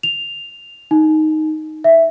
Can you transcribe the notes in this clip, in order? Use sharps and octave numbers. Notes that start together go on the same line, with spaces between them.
F7
D#4
E5